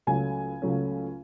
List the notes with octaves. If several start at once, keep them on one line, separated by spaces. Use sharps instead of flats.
C#2 C#3 F#3 A3 C#4 G#5
C#2 C#3 F#3 A3 C#4